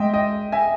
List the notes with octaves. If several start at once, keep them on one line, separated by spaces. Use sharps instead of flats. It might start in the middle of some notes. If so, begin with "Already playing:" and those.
Already playing: G#3 D#5 E5 G5
D#5 G5
E5 G#5